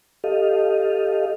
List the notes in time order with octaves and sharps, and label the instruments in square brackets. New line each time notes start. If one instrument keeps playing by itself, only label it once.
[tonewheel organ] G4 A4 D#5 F5